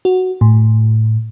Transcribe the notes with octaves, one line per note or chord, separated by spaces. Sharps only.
F#4
A2